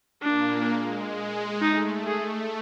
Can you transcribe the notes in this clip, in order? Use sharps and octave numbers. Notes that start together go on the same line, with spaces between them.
A#2 A#3 D4
G#3
A3 D#4
A3 G#4